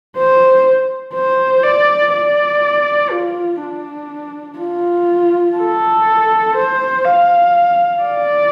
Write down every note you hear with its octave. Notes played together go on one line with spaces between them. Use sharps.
C5
C5
D5
D5
F4
D4
F4
A4
C5
F5
D5